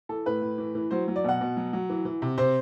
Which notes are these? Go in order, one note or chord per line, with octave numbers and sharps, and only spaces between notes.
E3 A4
A2 B4
A2
E3
E3
F#3 C5
F#3
D5
B2 F#5
B2
F#3
F#3
E3
E3
C3
C3 C5